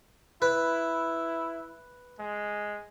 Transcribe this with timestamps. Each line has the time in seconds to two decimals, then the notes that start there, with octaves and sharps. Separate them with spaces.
0.42 E4 B4
2.19 G#3